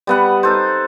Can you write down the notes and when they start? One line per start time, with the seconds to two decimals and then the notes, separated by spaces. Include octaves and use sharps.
0.07 G3 B3 F#5
0.43 D#4 A4 C5